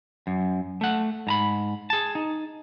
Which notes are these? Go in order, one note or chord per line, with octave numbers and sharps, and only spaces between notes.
F#2
A3 F#5
G#2 A#5 B5
G#4 A5
D#4